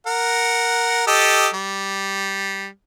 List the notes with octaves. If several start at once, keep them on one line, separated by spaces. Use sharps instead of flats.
A#4 F#5
G4 A4 D#5
G3